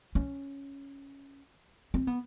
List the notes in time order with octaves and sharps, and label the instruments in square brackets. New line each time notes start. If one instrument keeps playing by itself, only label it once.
[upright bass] C#4
C4
B3